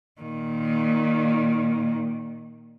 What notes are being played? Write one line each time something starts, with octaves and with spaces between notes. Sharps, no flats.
A#2 D#3